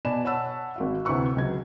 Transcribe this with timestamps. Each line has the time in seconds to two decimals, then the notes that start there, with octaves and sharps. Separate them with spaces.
0.05 B2 D5 G#5 A5 B5 E7
0.25 C#5 F#5 A5 B5 E6
0.76 G#1 F#4 F5
1.05 D2 C3 E4 B4 C#6 E6
1.36 C#2 F#3 G#6